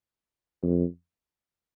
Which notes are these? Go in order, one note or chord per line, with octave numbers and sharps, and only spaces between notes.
F2